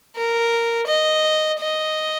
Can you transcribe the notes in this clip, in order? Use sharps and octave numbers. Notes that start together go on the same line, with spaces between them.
A#4
D#5
D#5